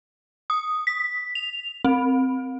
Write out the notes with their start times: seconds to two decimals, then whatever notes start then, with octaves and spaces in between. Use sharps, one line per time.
0.50 D#6
0.87 B6
1.35 F7
1.85 C4